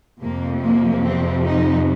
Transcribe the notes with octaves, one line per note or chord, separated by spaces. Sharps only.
F2 C3 F3 A#3
A#3
C4
D#4